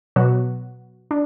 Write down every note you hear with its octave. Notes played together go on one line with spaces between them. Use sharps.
B2 F#3 B3 F#4
D4